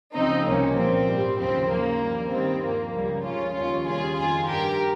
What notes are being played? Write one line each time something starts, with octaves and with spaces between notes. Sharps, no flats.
C#2 C#3 F3 C4 D#4
C2 C3 F3 A#3 C#4
C2 A#2 F3 C4
G#2 G3
D#2 C#3 F3 C4
D#2 C#3 F3 A#3
G2 G3
D#2 D#3 G3 C4
G2 F3 A#3
C#2 C#3 G3
C#2 C#3 F3 C#4 F4
D#2 D#3 G3 C#4 F4
D#2 C#3 G3 F4 G#4
F2 D#3 G3 F4 G#4
G2 G3 G4 A#4